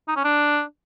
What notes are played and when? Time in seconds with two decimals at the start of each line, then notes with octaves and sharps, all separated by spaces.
0.08 D#4
0.16 C#4
0.24 D4